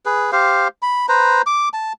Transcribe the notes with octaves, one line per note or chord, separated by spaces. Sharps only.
G#4 B4
G4 C5 F5
B5
B4 C5 A#5
D6
A5